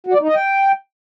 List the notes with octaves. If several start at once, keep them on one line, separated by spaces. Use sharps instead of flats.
F#4
D5
D#4
D#5
G5